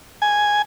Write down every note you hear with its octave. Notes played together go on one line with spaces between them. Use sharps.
G#5